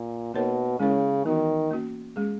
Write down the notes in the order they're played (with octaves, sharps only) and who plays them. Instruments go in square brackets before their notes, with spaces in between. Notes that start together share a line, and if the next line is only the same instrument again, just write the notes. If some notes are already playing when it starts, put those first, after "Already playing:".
Already playing: [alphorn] A#2
[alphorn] B2 [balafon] A#3 D#4 A#4 C#5
[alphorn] C#3 [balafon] G#3 C#4 E4 A#4 C#5
[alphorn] D#3 [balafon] E3 B3 D#4 F#4
[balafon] A#3 C#4 F#4
G#3 C#4 G#4